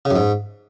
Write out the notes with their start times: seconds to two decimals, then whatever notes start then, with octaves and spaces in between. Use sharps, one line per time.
0.05 C#3
0.10 F#2
0.16 G#2